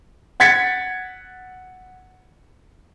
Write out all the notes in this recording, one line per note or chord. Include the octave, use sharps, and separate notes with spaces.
F#5 G#6 A6 B6 C#7